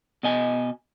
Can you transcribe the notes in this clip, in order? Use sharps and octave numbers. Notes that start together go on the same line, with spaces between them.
B2 D#5 G#5